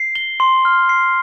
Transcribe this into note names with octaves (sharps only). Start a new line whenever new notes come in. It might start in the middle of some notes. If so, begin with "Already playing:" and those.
Already playing: C7
G7
C6
F6
C7